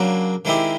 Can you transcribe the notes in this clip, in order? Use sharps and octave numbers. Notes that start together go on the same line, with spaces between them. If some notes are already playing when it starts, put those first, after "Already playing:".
Already playing: C#3 F#3 A#3 D4
D#3 G#3 C4 E4 G4